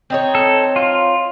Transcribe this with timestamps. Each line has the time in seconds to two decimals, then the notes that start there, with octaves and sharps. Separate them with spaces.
0.10 C4 D#4 C#5
0.35 A4
0.76 F4